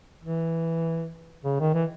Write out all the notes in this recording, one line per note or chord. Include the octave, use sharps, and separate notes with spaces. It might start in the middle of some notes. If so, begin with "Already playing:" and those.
E3
C#3
D#3
E3